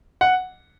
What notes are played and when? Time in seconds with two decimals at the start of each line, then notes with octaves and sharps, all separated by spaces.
0.21 F#5